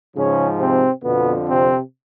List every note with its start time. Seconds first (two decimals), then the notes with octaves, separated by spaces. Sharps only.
0.17 G#2 C#3 F3 C#4
0.60 C3 C4
1.03 F2 B2 D3 F3 B3
1.48 C3 C4